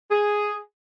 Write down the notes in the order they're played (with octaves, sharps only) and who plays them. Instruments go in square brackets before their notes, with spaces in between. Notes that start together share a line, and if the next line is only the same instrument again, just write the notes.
[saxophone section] G#4